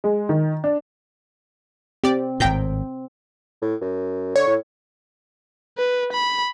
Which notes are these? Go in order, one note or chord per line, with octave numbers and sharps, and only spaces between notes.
G#3
D#3
D4
C4 G4 D5
G#1 A2 G5 A#5 G6
A2
F#2
D3 C#5
A2
B4
B5